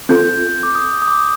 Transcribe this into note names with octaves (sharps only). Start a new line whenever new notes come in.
C4 F4 A4 G6
D6
D#6
D#6
D6